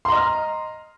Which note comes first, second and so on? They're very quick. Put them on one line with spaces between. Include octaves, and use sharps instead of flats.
C6 A#5 D#5 F6